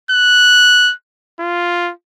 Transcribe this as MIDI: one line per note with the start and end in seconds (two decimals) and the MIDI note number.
0.11 0.93 90
1.40 1.92 65